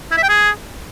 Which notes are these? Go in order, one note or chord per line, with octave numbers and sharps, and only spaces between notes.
E4
E5
G5
G#4